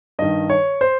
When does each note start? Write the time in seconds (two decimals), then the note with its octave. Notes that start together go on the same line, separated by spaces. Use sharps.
0.19 G2 D#3 D#5
0.49 C#5
0.81 C5